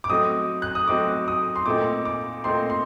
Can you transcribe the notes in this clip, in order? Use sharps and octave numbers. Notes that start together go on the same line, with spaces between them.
D6
F#3 A3 C4 D#4 D#6
F#6
D#6
F#3 A3 C4 D#4 D6
D#6
C6
A#2 A3 C4 D#4 D6
D6
A#2 A3 C4 D#4 C6
C6